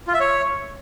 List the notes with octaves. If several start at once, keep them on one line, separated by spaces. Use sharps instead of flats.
F4
E5
C#5